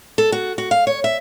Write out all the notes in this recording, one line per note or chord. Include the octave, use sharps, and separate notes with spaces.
A4
F#4
F#4
F5
C#5
E5